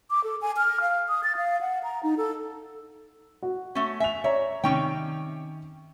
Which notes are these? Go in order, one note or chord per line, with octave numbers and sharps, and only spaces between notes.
D6
A4
G#5
F6
F5
D#6
A6
F5
F#5
A#5
D#4
A4
F#4
A3 C#4
E5 G#5 F7
C#5 D5 E5 A#5
C3 D#3 C#4 G5 C#6 D7